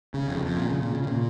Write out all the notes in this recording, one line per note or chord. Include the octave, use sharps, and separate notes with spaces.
C#3
F2
F2
A#2
C#3
A#2
C#3
A#2